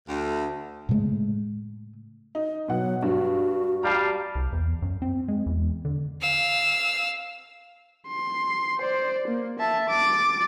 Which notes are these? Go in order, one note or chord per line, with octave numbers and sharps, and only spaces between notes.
D2
A2 C#3 G#3 A3
D#4
B2 F#3 F#5
G2 F#4
G3 F5 A5 A#5
C2
E2
F#2
C4
G#3
E2
D3
F5 E6
C6
C5 D5
A#3
E5 A5
D6 A6